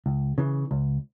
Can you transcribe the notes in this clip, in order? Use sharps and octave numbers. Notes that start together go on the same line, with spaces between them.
C#2
C#3 E3
C#2